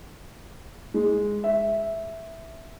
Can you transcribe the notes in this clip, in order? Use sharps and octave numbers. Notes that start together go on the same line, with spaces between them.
G#3
E5